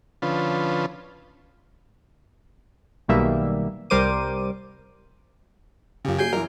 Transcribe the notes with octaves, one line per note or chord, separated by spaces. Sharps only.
D3 F3 C#4 F4 B4
B1 B2 D#3 G3 A#3 E5
C2 G3 A#4 C5 D6 D#7
F#2 C#3 F4 G4
F#1 F#3 G#5 G6 C7 D7
F#2 E3 A#4